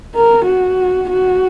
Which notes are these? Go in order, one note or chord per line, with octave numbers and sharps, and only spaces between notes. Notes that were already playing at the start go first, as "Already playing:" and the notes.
A#4
F#4
F#4